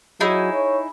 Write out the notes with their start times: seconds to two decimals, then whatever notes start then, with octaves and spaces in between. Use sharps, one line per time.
0.20 F#3 D#4 E4 G#4
0.53 C#5